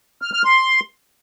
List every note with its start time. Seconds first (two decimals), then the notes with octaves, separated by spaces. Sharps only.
0.22 F6
0.33 F6
0.45 C6